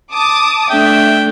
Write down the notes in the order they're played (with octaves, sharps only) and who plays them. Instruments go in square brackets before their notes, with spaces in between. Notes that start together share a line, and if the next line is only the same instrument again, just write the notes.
[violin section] A5 D6 D#6
[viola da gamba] A3 D4 [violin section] E5 [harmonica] G5